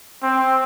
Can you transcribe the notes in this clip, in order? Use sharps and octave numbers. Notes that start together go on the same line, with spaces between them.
C4